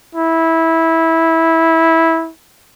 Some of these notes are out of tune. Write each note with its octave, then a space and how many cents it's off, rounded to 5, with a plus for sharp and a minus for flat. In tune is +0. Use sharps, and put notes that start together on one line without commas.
E4 -15